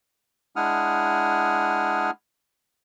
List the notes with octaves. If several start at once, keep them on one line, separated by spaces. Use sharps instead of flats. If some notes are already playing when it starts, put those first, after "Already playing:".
G#3 D4 E4 F#5 D#6 F6